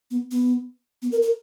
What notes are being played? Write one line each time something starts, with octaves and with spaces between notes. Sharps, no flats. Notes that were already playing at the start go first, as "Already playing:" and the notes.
B3
B3
B3
A#4
A#4